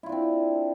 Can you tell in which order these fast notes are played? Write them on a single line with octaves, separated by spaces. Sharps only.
E4 F4 D4 C4